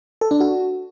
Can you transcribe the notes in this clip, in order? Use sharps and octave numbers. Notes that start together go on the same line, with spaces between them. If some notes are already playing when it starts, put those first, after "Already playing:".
A4
D4
F#4